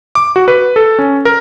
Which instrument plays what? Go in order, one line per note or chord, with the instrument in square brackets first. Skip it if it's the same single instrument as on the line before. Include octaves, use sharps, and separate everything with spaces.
[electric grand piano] D6
F#4
B4
A4
C#4
A#4